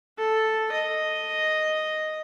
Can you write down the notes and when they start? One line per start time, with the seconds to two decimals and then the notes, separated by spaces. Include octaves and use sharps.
0.18 A4
0.72 D#5